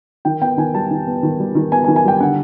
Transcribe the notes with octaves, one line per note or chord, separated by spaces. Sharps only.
D#3 G5
B3 G5
D#3 G#5
G3 A5
D#3
B3
D#3
G3
D#3
B3 G#5
G#5
D#3
G#5
G3 G5
D3 F#5